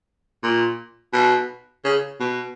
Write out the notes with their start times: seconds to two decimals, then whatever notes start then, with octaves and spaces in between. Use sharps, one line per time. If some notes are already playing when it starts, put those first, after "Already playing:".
0.43 A#2
1.13 B2
1.85 C#3
2.20 B2